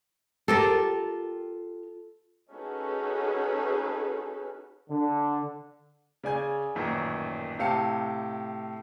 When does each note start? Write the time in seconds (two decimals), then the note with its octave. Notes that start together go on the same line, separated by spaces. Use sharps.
0.48 F4 G4 A4 A#4
2.52 C#4 D#4 F#4 G#4 A4 B4
4.90 D3
6.24 C#3 D5 G#5 G#6
6.75 A1 F#2 A#2 D#3
7.59 A2 C3 G4 F5 A5 C#7